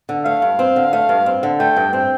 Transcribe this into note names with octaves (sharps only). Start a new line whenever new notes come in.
D3
A3 F5
G2
C4
D3
A3
G2
C4
D3
A3 G5
G2
C4 G5